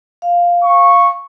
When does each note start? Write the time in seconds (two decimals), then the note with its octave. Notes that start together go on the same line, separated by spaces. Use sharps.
0.22 F5
0.63 C#6